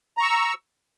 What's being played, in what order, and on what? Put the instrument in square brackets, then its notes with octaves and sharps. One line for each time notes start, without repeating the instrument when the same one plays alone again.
[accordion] A#5
C#6
E6